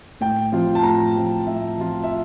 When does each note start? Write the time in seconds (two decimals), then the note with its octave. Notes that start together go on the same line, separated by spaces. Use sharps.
0.21 A2 G5
0.52 F3 C4 F4
0.75 A5
0.83 A2 A#5
1.14 F3 C4 F4
1.47 A2 E5
1.77 F3 C4 F4
2.04 E5